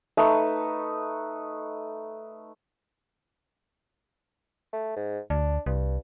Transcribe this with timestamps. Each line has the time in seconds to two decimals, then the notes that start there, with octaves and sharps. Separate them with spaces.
0.17 A3 D#4 B4
4.73 A3
4.96 G#2
5.30 D2 D4
5.66 C2 G2